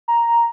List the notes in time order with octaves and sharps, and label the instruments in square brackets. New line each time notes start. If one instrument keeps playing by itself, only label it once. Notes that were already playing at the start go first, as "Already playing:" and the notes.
[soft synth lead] A#5